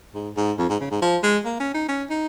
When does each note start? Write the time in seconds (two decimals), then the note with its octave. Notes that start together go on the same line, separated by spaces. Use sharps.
0.15 G#2
0.37 G#2
0.58 F2
0.69 G#2
0.80 C#3
0.91 G#2
1.02 F3
1.23 G#3
1.45 A#3
1.60 C#4
1.74 D#4
1.89 C#4
2.10 D#4